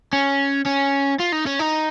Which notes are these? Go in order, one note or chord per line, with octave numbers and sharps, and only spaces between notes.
C#4
C#4
F4
D#4
C#4
D#4